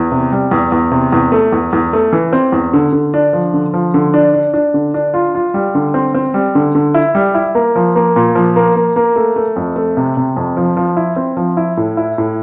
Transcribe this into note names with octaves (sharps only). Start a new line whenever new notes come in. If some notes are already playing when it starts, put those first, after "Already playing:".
Already playing: E2
C3
G3
E2
E2
C3
E2
A3
E2
E2
A3
E3
C4
E2
D3
D3
D4
F3
D3
F3
D3
D4
D4
D4
D3
D4
F4
F4
G3
D3
C4
C4
G3
D3
D3
E4
G3
E4
A#3
F3
A#3
A#2
F3
A#3
A#3
A#3
A3
A3
F2
A3
C3
C3
F2
F3
F3
E4
C4
F3
E4
A2
E4
A2